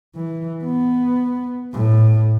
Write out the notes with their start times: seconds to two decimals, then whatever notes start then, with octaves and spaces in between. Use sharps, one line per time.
0.15 E3
0.64 B3
1.73 A2